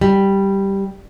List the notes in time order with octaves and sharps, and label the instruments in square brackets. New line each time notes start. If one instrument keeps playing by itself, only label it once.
[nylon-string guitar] G3